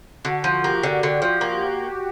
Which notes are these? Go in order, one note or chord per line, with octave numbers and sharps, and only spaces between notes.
D3 F#4
F3
A#3 G4
D3
D3 G4
F3
A#3